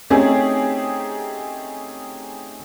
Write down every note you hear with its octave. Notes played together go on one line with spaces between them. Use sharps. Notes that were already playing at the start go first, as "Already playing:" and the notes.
A3 C4 C#4 D#4 G4 G#4